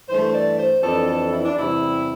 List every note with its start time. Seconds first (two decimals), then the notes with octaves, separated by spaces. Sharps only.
0.08 G2 E3 A3 C5
0.34 D5
0.58 C5
0.82 F2 E3 B3 D4 A4
1.07 A4
1.32 E4
1.45 D4
1.56 E2 C3 E3 G3 E4